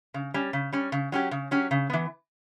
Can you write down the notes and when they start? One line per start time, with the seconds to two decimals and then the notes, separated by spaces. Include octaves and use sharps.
0.14 C#3
0.34 G3 C#4
0.53 C#3
0.73 G3 C#4
0.92 C#3
1.12 F#3 C#4 G4
1.31 C#3
1.51 F#3 C#4 G4
1.71 C#3
1.90 E3 B3